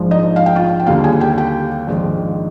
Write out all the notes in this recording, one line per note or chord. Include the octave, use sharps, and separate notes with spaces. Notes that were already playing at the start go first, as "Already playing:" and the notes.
Already playing: A#1 G#2 F3 G#3
D#4 D#5
F5
G5
F4 F5
G5
D#2 D3 G3 A#3 F4 F5
G#4 G#5
G4 G5
G4 G5
A#1 G#2 D#3 G#3